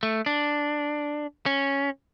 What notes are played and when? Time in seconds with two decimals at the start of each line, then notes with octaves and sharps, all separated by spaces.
0.03 A3
0.26 D4
1.46 C#4